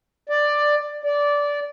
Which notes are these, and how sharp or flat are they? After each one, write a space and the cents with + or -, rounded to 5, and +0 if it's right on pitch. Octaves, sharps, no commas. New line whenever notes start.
D5 +10
D5 -15